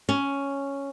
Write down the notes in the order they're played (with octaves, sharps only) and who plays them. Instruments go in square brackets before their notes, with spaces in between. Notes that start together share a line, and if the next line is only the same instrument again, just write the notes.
[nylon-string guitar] C#4